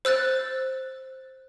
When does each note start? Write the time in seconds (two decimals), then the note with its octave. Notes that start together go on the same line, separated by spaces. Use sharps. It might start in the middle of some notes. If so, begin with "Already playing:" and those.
0.05 C5 E6 F#6 A6